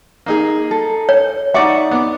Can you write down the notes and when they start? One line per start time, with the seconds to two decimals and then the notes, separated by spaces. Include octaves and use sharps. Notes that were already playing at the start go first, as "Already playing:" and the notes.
0.26 A#3 D#4 G#4
0.71 A4
1.09 C#5
1.54 D#4 D5 E5 F#5 C#6 D6
1.91 B3 D6